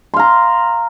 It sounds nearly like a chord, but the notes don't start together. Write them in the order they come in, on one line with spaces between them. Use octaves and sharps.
C6 F5 A#5